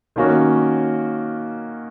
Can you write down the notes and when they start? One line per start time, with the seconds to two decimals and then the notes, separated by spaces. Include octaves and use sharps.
0.16 D#3 A#3 C#4 F#4